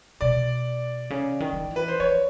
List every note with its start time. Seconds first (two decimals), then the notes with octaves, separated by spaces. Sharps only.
0.21 B2 D5
1.10 C#3
1.40 D#3
1.53 F#3
1.62 F3
1.71 E3
1.76 B4
1.88 C5
2.00 F3 C#5